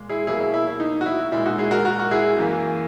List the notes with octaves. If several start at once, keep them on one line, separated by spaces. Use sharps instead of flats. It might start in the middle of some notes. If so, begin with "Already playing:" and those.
Already playing: A#2 G#3
E4 G#4
B2 F#3 A#3 E4 G#4
E4
E4
E4
D#4
F#4
E4
A#2 G#3 E4
D#4 F#4
E4 G#4
F#4 A#4
F#4 A#4
F#4
E4 G#4
F#2 E3 A#3